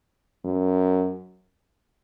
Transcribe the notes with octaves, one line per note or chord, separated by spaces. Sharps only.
F#2